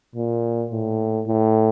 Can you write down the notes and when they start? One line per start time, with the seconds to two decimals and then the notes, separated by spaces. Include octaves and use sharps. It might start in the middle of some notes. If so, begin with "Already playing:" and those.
0.15 A#2
0.71 A2
1.27 A2